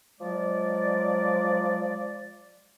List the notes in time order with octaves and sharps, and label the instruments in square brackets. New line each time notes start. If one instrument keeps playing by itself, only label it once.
[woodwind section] F3 F#3 G#3 D5